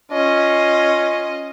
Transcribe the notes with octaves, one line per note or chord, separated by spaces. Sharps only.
C#4 F4 D#5